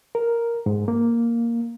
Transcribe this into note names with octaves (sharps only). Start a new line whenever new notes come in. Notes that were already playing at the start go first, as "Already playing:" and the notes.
A#4
G#2
A#3